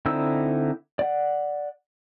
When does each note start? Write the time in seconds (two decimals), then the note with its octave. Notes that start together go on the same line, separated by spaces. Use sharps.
0.06 D3 C4 D#4 E4 E6
0.99 D5 F#5